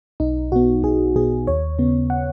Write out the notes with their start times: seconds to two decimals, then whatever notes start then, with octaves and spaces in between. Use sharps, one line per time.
0.20 B1 D#4
0.52 B2 B3 F#4
0.83 B1 G#4
1.15 B2 B3 G#4
1.47 D#2 C#5
1.79 C#3 B3
2.10 F#5